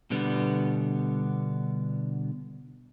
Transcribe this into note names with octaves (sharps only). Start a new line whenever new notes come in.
B2 D3 G3 B3